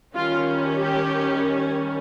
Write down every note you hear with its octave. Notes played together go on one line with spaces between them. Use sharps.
D#3 G3 C#4 F4
G4